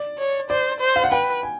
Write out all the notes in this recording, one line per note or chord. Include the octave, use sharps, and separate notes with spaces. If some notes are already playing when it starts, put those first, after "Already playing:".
Already playing: D5
C#5
C5 D5
C5
F5
F#5
B4 G5
G#5